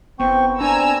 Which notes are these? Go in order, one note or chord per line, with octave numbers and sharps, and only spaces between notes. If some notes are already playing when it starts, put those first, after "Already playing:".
F#1 B3 C4 G5 C#6
C4 D4 G#5 A#5 E6